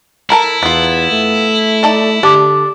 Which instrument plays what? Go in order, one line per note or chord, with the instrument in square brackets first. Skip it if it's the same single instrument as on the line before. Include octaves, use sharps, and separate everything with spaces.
[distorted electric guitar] E4 [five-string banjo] A4 A#4 B5
[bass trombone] E2 [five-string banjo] B3 F4
[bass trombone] A3
[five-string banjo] D#4 A4 D5
[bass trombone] D3 [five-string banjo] D4 [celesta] G4 D6